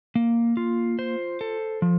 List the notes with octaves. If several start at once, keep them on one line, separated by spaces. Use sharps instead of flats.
A#3
F4
C5
A4
F3